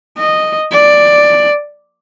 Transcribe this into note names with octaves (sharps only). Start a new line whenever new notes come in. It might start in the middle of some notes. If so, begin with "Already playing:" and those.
D#5
D5